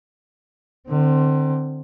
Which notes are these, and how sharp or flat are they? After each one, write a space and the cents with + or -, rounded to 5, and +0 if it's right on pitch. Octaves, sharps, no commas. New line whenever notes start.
D3 +35 C4 +0